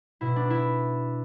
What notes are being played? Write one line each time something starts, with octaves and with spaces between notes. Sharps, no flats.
B2 E4
D4
E4